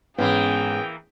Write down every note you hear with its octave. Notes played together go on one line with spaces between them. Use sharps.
G#2 E3 A#3 B3 C#4 G#4 G5